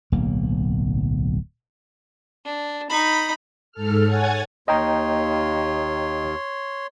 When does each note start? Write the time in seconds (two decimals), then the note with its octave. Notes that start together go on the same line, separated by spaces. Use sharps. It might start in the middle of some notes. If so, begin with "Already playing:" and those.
0.12 D1 B1 A#3
2.45 D4
2.90 D#4 B5
3.72 G#2 A4 F6
4.05 C#5 F#5 G#5 G#6 A6
4.68 D#2 C#5 D#5 G5 A#5 C6